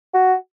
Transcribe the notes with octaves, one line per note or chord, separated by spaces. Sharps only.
F#4